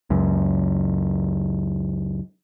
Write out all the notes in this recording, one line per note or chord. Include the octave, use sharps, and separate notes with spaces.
C#2 F#2